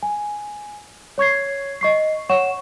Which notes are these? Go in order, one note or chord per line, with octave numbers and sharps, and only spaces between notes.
G#5
C#5 C#6 G#6 C7
D#5 C#6 C7
C#5 F#5 C#6 E7